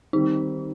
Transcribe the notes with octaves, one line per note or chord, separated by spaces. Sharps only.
D#3 G3 C4 D#4